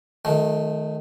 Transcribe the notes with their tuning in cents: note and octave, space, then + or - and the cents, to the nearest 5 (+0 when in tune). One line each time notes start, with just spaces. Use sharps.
D#3 -5 F#3 -45 A3 -30